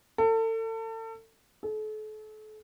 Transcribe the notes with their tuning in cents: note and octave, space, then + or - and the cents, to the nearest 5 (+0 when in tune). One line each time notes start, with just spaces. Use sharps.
A4 +35
A4 -40